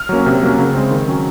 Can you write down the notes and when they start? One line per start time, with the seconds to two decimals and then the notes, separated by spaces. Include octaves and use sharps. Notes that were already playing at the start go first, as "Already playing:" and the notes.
Already playing: F6
0.09 F#3 A#3 C#4
0.26 C3
0.43 F#3 A#3 C#4
0.58 C#3
0.74 G#3 C4
0.91 D#3
1.08 F#3 C#4